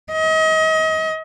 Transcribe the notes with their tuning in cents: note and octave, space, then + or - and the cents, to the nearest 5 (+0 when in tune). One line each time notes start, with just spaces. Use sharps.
D#5 +35